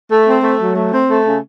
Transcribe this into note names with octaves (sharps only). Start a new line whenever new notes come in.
A3
C4
A3
F#3
A3
C4
A3
C#3